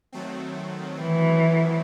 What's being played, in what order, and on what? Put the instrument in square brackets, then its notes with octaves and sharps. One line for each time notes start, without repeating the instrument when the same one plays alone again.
[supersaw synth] D#3 F#3 A3 C4
[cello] E3